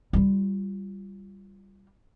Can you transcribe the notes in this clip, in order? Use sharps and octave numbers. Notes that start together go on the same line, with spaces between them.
G3 F4